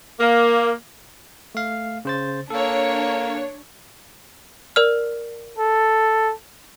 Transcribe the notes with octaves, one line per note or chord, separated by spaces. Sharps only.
A#3
A3 F5
C#3 C5 A6
A#3 D4 A4 C#5
A#4 D5 F6
A4